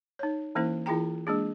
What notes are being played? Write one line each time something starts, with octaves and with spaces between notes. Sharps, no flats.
D#4 C#5
E3 A#3 C#4 E4 C5
E3 E4 F4 G#4 G5 A#5
G#3 A#3 D4 G#4